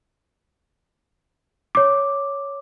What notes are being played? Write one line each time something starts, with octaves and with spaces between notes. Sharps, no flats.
C#5 D6